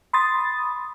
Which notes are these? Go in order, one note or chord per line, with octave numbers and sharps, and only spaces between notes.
B5 C6 D#6 A6